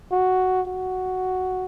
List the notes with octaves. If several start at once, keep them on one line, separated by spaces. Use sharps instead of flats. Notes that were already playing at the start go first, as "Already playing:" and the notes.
F#4
F#4